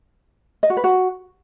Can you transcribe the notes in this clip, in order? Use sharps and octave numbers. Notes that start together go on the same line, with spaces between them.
D#5
F#4
B4
F#4